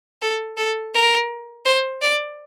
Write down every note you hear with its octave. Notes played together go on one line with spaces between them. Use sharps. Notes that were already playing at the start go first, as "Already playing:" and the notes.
A4
A4
A#4
C5
D5